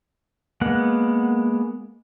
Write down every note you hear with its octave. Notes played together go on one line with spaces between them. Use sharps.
G#3 A#3 B3 F#5